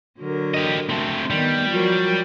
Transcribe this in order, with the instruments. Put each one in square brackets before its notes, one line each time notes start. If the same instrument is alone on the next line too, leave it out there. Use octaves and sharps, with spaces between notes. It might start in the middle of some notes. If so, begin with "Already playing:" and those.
[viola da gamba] D3 F#3 A#4
[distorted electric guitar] G4 D#5
A3 C4
[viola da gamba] D#3 B3 [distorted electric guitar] G3
[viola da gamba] F3 F#3 A#4